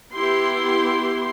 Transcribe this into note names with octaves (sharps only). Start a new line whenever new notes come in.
B3 E4 G4 C6